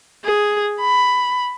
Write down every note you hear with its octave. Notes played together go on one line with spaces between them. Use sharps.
G#4
B5